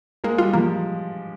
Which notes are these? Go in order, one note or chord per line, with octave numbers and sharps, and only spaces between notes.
G#3 A#3
G3 F4
F3 A#3